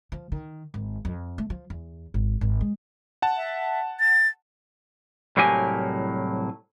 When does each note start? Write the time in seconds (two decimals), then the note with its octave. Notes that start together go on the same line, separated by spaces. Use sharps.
0.12 F3
0.32 D#3
0.74 G#1
1.05 F2
1.38 A3
1.50 F3
1.70 E2
2.14 G#1
2.41 G#1
2.61 G#3
3.22 F#5 A5
3.37 E5
4.00 A6
5.37 C2 A2 F#3 A#3 G4 G#5